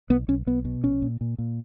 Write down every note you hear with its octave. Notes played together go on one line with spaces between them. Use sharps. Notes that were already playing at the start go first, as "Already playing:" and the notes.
B1 B3
B1 C#4
B1 B3
B2
A#1 C#4
A#2
A#2
A#2